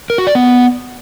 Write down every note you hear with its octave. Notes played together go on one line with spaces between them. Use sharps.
A#4
F#4
D5
B3